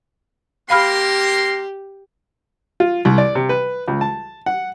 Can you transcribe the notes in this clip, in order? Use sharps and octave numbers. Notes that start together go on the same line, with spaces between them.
A#3 G4 A#4 F5 B5 C6 F6
F4
C2
D5
C3
B4
C#2
A5
F#5